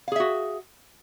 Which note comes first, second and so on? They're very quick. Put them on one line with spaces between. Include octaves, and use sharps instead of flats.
F5 G#4 E5 F#4